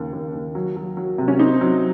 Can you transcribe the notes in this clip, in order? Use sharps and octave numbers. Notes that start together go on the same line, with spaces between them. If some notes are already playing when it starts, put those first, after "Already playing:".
Already playing: D#2 C#3
D#2
D#2
F#3
F#3
F#3
C3
C#4
C4 D#4
F#3